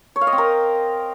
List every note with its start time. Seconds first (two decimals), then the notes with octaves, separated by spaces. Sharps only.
0.16 C#5
0.21 F5
0.27 D#5
0.33 C4
0.38 A#4